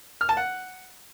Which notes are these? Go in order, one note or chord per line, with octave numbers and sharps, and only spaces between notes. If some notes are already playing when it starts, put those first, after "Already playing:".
F6
A5
F#5